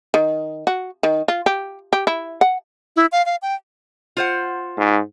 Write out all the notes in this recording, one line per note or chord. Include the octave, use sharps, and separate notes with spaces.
D#3
F#4
D#3
F4
G4
G4
E4
F#5
E4
F5
F5
G5
F4 C5 F#5
G#2